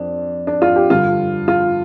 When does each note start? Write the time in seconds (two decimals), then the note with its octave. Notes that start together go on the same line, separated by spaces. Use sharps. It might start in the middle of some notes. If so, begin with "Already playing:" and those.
Already playing: F2 D4
0.47 D4
0.62 F4
0.76 G4
0.90 G2 D3 F4
1.48 F4